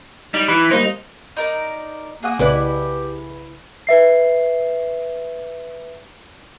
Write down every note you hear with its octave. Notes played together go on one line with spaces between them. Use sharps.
G3 D#4
E3 B5
G3 A#3 D#4 C5
D#4 A#4 D5
A#3 G#4 F#5 D#6
C2 C#3 E4 G4 B4 D5
B4 E5 C7